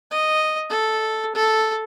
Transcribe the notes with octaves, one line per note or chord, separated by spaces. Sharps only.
D#5
A4
A4